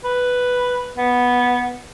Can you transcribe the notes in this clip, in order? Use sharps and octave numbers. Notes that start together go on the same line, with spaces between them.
B4
B3